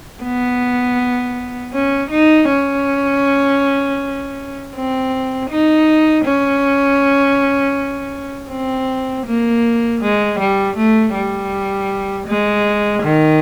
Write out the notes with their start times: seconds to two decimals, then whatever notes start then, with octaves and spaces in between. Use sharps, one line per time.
0.23 B3
1.73 C#4
2.11 D#4
2.49 C#4
4.75 C4
5.50 D#4
6.24 C#4
8.51 C4
9.26 A#3
10.01 G#3
10.39 G3
10.76 A3
11.14 G3
12.27 G#3
13.02 D#3